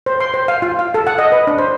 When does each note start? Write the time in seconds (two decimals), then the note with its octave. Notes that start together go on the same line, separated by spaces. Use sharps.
0.06 C5
0.20 C6
0.34 C5
0.48 F5
0.62 F4
0.79 F5
0.94 A4
1.07 F#5
1.18 D#5
1.32 B4
1.47 D4
1.58 C5